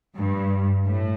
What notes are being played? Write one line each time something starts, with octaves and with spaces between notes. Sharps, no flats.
G2
A2